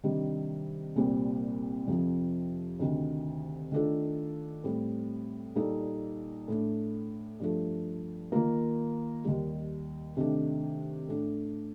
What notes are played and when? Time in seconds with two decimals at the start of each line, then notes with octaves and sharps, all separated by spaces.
0.04 C3 D#3 G3 D4
0.96 C2 A#2 G3 C4
1.88 F2 C3 F3
2.79 D2 C3 D#3
3.72 D#3 A3 D4 F4 A4
4.64 A2 G3 C4
5.56 A#2 G3 A#3 D#4 A4
6.48 A2 A3 D4
7.40 G2 F3 A3
8.32 D#3 A#3 F4 A#4
9.24 D#2 D#3 G3
10.17 C3 D#3 A3 D4
11.09 A2 A3 D4